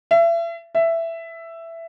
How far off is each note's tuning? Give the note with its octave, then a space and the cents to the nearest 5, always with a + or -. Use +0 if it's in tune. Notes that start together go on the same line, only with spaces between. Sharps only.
E5 +35
E5 +10